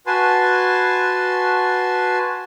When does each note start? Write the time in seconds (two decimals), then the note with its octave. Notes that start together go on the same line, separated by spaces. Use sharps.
0.07 F#4 B4 G#5 A5 C6